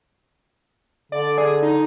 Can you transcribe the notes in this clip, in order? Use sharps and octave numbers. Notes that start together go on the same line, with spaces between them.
D3 D5
G#4 D5
D#4